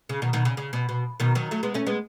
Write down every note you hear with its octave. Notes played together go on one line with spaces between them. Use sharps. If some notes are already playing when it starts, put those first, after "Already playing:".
C#3
B2 D#3
B2 D#3
C#3
C#3
B2
B2
B2 D#3
D#3 F#3
F#3 A3
G#3 B3
A3 C#4
G#3 B3